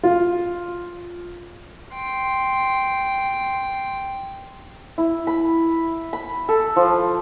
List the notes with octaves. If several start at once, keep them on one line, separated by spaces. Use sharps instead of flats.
F4
G5 C6
E4
B5
B5
A4
F3